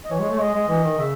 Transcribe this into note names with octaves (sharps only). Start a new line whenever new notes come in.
D#5
E3 C#5
G#3
A3
G#3 D#5
G#3
E3
D#3
C#3 E5